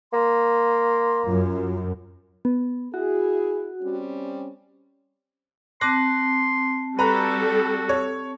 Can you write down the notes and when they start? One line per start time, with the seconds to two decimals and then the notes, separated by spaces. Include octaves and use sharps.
0.13 A#3 C6
1.27 F#2 F4
2.45 B3
2.94 E4 F#4 G#4
3.82 G3 C4 C#4
5.81 C4 A5 C6 D6 F#6 A#6
6.99 G3 F#4 A4 B4 A#5
7.89 C#5